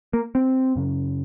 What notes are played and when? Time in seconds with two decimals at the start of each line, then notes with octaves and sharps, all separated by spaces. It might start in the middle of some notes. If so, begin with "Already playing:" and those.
0.13 A#3
0.35 C4
0.76 F#2 C#3